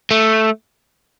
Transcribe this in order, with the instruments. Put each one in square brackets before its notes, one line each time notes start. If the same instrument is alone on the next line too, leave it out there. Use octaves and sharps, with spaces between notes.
[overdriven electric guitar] A3